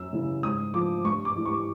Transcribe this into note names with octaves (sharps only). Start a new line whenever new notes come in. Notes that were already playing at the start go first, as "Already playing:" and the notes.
Already playing: F#2 E6
C#3 E3 G3
G#2 D#6
F3 D6
G2 C#6
D6
E3 G3
C#6